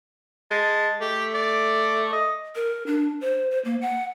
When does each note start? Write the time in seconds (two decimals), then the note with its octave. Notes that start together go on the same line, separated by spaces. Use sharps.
0.51 G#3 A5
1.01 A3 G4
1.34 D5
2.13 D#5
2.55 A#4
2.87 D4
3.21 C5
3.51 C5
3.65 A#3
3.81 F#5